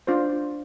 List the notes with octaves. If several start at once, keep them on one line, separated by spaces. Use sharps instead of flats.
D4 F4 C5